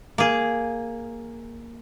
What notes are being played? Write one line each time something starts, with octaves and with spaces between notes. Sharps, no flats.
A#3 G#4